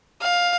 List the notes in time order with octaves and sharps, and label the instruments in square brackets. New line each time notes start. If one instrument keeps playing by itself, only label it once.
[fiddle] F5